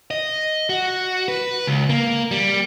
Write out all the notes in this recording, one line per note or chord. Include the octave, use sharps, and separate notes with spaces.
D#5
F#4
B4
C#2
A#3
G3